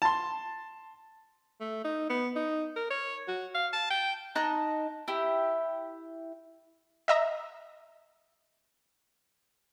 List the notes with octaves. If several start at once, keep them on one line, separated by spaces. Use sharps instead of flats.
A5 C6
A3
D#4
B3
D#4
A#4
C#5
F#4
F5
A5
G5
D#4 A5 A#5 F#6
E4 G4
D#5 E5 A#5